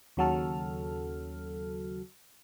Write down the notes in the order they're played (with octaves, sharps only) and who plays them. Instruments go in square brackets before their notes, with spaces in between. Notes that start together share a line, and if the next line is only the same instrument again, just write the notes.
[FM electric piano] D#2 C#3 F#3 F#4 A4 F6